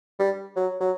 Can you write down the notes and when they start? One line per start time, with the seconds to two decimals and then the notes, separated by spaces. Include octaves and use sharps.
0.19 G3
0.56 F#3
0.80 F#3